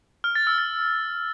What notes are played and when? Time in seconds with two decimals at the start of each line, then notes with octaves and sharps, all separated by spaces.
0.24 F6
0.35 A6
0.47 E6
0.58 A6